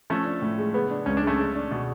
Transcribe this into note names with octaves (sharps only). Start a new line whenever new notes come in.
F3 A3 C#4
D4
A2
G#3
C#3 B3
D4
C#2 C#4
D4
G#3 A3 C#4
G#3
D4
B2